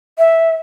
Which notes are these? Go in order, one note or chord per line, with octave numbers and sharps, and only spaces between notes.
E5